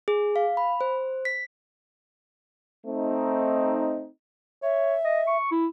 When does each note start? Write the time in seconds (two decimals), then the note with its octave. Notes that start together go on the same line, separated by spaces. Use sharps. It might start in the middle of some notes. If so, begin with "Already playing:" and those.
0.08 G#4
0.36 F5
0.57 B5
0.81 C5
1.25 B6
2.86 A3 C4 D#4
4.62 C#5 E5
5.04 D#5
5.27 C#6
5.51 E4